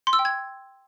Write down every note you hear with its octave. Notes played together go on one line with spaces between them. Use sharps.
C6
E6
G5
G#6